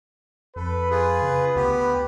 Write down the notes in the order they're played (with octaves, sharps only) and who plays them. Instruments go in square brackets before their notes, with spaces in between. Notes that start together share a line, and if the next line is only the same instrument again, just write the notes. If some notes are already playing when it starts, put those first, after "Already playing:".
[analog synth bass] F2 [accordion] A4 [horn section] B4
[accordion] F4 G#4
[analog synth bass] C#3
[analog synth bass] D2 [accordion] B3 G4